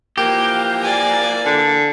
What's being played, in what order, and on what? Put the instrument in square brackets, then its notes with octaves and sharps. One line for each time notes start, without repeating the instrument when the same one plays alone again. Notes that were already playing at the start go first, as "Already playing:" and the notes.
[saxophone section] E3 F3 A#3 [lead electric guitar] G4
[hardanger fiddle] D5 G#5
[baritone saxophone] D3